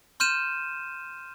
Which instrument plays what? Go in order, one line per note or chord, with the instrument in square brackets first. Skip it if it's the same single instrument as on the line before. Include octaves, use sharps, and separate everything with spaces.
[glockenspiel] C6 F6 G6 D#7 E7